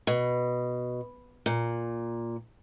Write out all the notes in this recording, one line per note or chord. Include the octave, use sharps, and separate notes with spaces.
B2
A#2